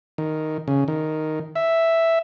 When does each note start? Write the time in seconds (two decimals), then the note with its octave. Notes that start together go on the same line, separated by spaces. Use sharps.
0.18 D#3
0.68 C#3
0.88 D#3
1.56 E5